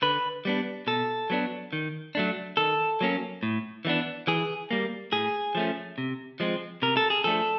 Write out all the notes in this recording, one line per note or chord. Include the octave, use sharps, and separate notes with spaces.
D3 B4
G3 B3 D4
B2 A4
F#3 B3 D4
D#3
F#3 A3 D4
D#3 A4
F#3 A#3 C#4
A2
E3 G3 B3 D4
E3 G#4
G3 A#3
A2 G#4
F3 A3 C#4
C3
F3 G#3 C4
C3 A#4
A4
G#4
F3 A3 D4 A4